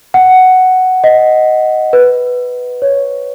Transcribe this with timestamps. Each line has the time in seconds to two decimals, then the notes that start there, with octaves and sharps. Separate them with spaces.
0.14 F#5
1.04 D#5
1.93 B4
2.82 C#5